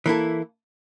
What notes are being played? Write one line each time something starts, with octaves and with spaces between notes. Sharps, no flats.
E3 A#3 E4 A4